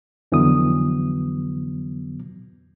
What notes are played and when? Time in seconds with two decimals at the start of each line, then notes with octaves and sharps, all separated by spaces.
0.32 F2 D3 E3 F#3 B3 D#6